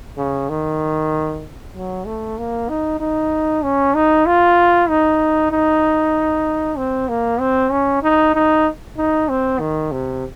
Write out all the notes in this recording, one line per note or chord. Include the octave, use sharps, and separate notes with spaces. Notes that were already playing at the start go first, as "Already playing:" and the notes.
C#3
D#3
F#3
A3
A#3
D#4
D#4
C#4
D#4
F4
D#4
D#4
C4
A#3
C4
C#4
D#4
D#4
D#4
C4
D#3
C3